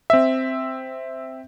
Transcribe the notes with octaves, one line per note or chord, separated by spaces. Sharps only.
C4 E5